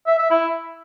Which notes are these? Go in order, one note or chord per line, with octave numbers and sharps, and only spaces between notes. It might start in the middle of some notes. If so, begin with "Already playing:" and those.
E5
E5
E4